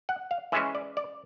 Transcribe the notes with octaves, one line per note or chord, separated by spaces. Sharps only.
F#5
F5
E3 G#3 C#4 E5
D5
D5